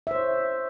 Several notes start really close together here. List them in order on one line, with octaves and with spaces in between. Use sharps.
E5 C5 C#5